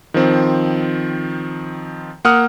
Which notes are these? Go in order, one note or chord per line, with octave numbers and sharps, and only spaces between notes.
D#3 F3 C4
A#3 F#5 D#6 F6